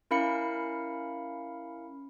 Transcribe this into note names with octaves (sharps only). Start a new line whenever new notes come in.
C#4 E4 A#4 F5 B5 C#7